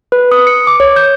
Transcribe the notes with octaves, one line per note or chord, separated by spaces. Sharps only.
B4
D#6
C#7
D6
C#5
G6